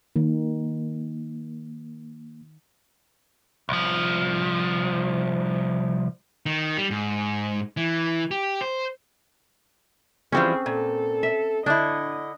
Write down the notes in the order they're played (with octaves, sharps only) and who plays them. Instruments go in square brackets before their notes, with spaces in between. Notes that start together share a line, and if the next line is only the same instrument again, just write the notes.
[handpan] D#3 [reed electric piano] A#3
[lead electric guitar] C2 F3
[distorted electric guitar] D#3
G3
G#2
E3
G4
C5
[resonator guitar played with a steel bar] E3 F3 G3 [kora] C4 C#4 [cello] G#4
[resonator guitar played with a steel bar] A#2 [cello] A4
[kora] E5
[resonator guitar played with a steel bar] D3 E4 [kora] D4 [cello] D#5